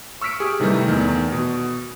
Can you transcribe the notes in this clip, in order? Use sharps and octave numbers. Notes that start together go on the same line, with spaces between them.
C#6 E6 F6 B6 C#7 D7
G4 G#4
C3 D#3 E3 G3 A3
E2 D#3
B2